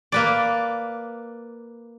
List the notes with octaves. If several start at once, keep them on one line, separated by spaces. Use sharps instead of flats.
A#3 B4 D5